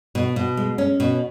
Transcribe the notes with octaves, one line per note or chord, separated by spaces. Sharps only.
B2
B2
G#3
C#4
B2